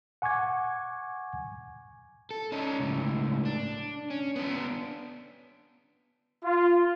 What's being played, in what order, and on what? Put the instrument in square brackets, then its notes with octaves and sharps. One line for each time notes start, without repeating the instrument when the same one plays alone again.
[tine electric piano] F#5 G#5 C#6 D6 G#6
[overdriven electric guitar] A4
C#4 D#4
C#2 A2
D4
C#4
B3 D4
[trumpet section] F4